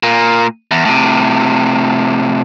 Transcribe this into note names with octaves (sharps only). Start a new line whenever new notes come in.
A#2 A#3
E2
A2 C3